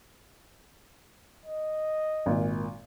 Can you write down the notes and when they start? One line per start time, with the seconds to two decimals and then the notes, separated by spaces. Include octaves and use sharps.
1.46 D#5
2.26 G#1 A#2